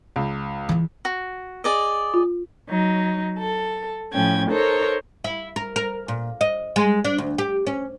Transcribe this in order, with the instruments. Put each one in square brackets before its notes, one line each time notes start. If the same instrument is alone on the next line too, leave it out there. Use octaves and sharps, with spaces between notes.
[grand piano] C#2
[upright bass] E3 G3
[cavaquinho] F#4
G#4 D5 D#5
[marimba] F4
[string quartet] F#3 D#4
A4
A2 F3 C#4 G5 G#6
D#4 A4 A#4 C5 C#5
[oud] E4
A#4
A#4
A#2
D#5
G#3
D4
D2
G4
C#4